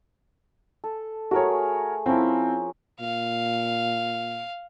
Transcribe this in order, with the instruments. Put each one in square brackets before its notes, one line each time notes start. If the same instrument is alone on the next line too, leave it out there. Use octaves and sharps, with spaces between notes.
[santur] A4
[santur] A3 G#4 [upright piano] F#4 A#4 C#5
[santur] F3 C#4 A#4 [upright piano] C4 E4
[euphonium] A#2 [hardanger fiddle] F5